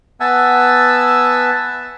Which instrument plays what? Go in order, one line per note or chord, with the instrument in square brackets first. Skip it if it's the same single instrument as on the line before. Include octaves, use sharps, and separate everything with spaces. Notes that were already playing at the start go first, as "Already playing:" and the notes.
[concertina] B3 E5 F#5 G#5 A5 E6